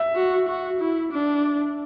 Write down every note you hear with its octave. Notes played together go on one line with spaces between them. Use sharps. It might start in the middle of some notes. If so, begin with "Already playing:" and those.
Already playing: E5
F#4
F#4
E4
D4